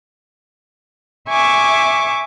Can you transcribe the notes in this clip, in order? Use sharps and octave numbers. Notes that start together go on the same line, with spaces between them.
E5 G#5 C#6 D6